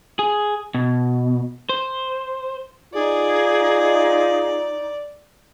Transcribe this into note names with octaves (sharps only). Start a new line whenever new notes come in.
G#4
B2
C5
D#4 F4 G#4 D5